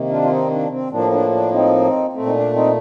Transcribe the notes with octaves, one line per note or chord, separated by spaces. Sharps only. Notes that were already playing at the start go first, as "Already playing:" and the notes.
Already playing: C3 D#3 A#3
D4 F4
F4
C4 D#4
D4
C4
A2 F3 A#3 D4
D4
D4
C4 D#4
A#2 A3 C4
D#4
D4
C4 D#4